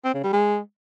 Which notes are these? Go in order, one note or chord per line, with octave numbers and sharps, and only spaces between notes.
C4
C#3
G3
G#3